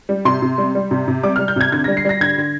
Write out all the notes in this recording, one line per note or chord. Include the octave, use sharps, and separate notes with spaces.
G3
C3 C6
C3
G3
G3
C3
C3
G3 D6
G3 F6
G6
C3 G#6
D3 G#6
A#6
G3
C7
G3 A#6
D3 G#6
D3